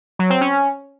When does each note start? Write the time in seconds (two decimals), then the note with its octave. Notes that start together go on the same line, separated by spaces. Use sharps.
0.19 F#3
0.30 C4
0.41 C#4